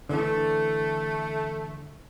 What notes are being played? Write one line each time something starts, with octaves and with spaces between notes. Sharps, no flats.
D3 E3 A3 D4